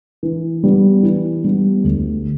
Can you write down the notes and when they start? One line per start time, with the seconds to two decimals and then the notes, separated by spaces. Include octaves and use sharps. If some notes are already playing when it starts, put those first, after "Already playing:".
0.23 E3
0.64 G3 B3
1.03 E3
1.44 G3 B3
1.84 D2